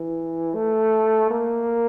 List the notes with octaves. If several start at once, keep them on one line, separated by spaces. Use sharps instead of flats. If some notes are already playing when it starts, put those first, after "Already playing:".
Already playing: E3
A3
A#3